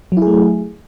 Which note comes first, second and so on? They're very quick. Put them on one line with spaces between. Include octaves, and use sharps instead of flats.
F#3 E4 G#4 A3